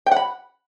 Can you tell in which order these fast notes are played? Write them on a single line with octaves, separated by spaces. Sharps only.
G5 F#5 B5